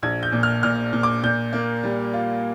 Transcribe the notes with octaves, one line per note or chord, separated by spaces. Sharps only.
A#1 G#6
G6
A#2
F6
A#2 F6
A#2
D6
A#2 G6
A#3
G3
F4